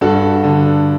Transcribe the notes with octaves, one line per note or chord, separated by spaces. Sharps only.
G2 F#4 A4
D3